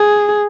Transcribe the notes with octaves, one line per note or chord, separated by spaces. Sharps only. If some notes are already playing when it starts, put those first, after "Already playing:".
Already playing: G#4